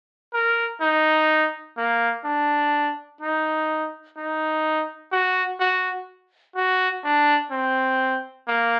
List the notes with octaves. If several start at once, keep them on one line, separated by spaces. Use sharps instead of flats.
A#4
D#4
A#3
D4
D#4
D#4
F#4
F#4
F#4
D4
C4
A#3